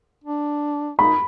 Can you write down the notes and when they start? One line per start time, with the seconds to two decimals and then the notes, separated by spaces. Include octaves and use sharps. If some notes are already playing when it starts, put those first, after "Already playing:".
0.24 D4
0.99 D#4 B5